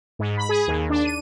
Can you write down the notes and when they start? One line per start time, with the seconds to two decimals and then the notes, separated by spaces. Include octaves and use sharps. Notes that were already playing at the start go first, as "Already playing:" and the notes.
0.19 G#2
0.37 B5
0.49 G#4
0.68 D#2
0.90 D4
1.05 D#7